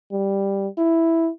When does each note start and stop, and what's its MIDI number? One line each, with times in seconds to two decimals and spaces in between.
0.12 0.68 55
0.78 1.30 64